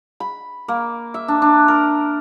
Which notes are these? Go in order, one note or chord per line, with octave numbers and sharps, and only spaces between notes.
B5
A#3
E5
D4
D4
A#4